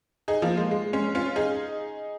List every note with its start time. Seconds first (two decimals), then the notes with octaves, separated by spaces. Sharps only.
0.28 D#4 G#4
0.42 F3 A#3
0.57 G#3
0.71 G#3
0.93 G#3 C#4
1.15 C#4 F4
1.36 D#4 G#4